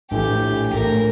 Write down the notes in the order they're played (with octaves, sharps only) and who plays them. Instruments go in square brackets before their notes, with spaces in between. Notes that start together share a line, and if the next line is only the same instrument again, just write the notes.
[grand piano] A#1 A2 E3 A3 [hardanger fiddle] G4
[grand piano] A#1 A2 E3 A3 [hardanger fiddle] A#4